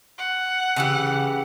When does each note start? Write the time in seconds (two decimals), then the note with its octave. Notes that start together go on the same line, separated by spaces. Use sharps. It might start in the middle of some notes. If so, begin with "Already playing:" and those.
0.18 F#5
0.76 C#3 E3 G4